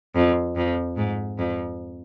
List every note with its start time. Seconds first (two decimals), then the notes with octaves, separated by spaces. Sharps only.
0.15 F2
0.56 F2
0.97 G#2
1.38 F2